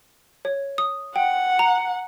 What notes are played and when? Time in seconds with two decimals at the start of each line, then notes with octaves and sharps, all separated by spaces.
0.45 C#5
0.78 D#6
1.16 F#5 G5
1.59 A#5